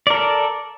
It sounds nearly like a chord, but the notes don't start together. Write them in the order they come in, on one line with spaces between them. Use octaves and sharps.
D5 A#4 A4